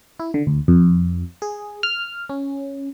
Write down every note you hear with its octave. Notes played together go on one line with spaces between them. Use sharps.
E4
D3
D2
F2
G#4
F6
C#4